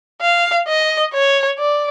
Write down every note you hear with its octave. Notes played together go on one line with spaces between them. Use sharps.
F5
D#5
C#5
D5